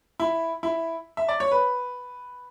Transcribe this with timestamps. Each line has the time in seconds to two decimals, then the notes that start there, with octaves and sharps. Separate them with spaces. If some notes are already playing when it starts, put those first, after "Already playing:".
0.20 E4
0.63 E4
1.17 E5
1.29 D5
1.40 C#5
1.51 B4